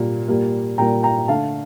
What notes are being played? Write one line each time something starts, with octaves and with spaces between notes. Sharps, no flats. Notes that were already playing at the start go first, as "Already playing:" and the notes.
Already playing: A#2 G3 A#3
A#2 G3 A#3
A#2 G3 A#3 G5 A#5
G5 A#5
D3 A3 F5 A5